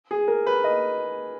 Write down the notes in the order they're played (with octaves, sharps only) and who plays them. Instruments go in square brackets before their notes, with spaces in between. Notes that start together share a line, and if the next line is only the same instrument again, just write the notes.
[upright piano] G#4
A#4
B4
D#5